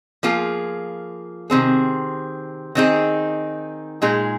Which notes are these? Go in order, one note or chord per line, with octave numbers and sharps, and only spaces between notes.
F3 A#3 F4 G#4
C3 D#3 C4 G#4
D#3 C4 D#4 G#4
A#2 G#3 D#4 G#4